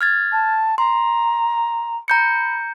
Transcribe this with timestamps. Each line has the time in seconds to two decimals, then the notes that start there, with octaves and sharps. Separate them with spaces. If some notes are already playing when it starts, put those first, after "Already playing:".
0.01 F6 G#6 A6
0.32 A5
0.78 A#5 C6
2.08 A#5 B5 G6 C#7